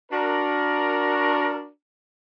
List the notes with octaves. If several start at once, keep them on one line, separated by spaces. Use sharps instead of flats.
D4 F#4 A#4